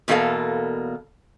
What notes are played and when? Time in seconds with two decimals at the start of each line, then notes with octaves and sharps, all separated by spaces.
0.08 E2 B2 G3 A#3 A4 F5